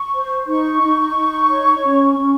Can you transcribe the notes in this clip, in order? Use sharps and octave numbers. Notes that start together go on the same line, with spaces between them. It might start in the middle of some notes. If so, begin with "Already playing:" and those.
Already playing: C#6
C5
D#4 C#6
D#4
D#4
C#5
C#4
C#4